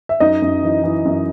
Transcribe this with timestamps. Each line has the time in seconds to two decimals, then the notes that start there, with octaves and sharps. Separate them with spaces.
0.09 E5
0.20 F#2 D#4 D#5
0.42 F#2
0.63 E3
0.84 E3
1.05 F#2